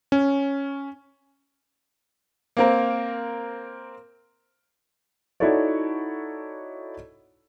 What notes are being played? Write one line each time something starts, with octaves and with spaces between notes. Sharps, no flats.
C#4
A#3 C4 A#4
D#4 E4 F#4 A4 C#5 D5